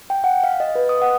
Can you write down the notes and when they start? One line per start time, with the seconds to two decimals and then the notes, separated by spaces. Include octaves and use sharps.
0.10 G5
0.24 F#5
0.43 F5
0.60 D#5
0.75 B4
0.89 D#6
1.02 F#5